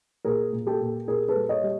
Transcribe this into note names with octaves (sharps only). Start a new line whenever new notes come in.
A#2 G#4 A#4
A#2
G4 A4
A#2
A#2 G#4 A#4
A4 B4
G3
C#5 D#5
G3